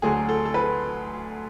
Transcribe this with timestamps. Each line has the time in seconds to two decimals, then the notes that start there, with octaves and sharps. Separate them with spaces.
0.02 D2 D3 F#3 A3 G#4
0.29 A4
0.45 A4
0.54 B4